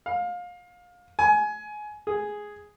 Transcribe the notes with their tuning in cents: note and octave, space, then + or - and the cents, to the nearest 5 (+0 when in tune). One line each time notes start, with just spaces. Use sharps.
F5 +25
G#5 +20
G#4 +0